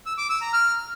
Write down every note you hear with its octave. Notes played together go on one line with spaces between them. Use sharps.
E6
D6
E6
A#5
F6